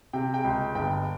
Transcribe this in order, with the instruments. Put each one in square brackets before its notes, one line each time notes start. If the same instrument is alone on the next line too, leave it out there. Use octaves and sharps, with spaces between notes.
[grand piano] C3 [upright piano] G5
[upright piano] G5
[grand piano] C#2
[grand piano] G1 [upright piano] G5